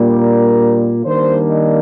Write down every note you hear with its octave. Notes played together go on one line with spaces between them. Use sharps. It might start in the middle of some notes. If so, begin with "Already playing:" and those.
Already playing: A#2 G3 A#3 D4
A#4
D#3 G3 A#3 D4 C5
D#5